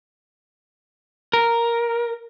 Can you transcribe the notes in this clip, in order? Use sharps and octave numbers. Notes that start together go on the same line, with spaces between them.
A#4